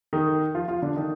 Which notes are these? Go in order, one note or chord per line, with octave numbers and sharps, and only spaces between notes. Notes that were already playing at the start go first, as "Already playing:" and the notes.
D#3 D#4
F3 F4
F3 F4
D3 D4
D#3 D#4